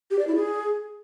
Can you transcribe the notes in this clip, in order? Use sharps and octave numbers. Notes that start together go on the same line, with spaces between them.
G4
D5
E4
G#4